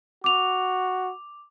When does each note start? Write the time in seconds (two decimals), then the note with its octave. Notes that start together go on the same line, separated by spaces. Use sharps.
0.24 F#4 D6 F7